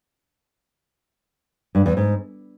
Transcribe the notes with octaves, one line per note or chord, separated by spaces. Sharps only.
G2
E2
G#2